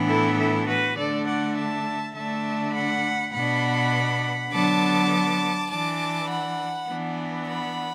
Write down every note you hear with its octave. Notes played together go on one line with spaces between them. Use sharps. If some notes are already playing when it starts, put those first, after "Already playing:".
Already playing: A2 E3 B3 D4
E4 A4
E4 A4
F#4 B4
D3 A3 D4 A4 D5
D5 F#5
E5 A5
D3 A3 D4 E5 A5
F#5 B5
B2 B3 D4 F#5 B5
D3 F#3 B3 D4 A5 D6
E3 D4 A5 D6
F#5 B5
E3 B3 D4
F#5 B5